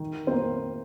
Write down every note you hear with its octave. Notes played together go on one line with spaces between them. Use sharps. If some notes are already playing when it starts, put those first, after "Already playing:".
Already playing: D#3
C4
A#3